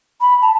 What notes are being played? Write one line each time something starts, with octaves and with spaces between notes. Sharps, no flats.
B5
A5